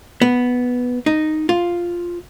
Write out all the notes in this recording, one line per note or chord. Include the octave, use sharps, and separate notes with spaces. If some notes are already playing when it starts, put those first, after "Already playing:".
B3
D#4
F4